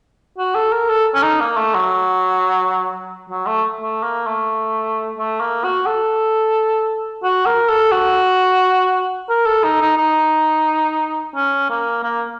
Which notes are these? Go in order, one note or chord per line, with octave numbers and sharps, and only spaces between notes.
F#4
A4
A#4
A4
C#4
D#4
A#3
A3
F#3
F#3
A3
A3
A#3
A3
A3
A#3
F#4
A4
F#4
A#4
A4
F#4
A#4
A4
D#4
D#4
D#4
C#4
A#3
A#3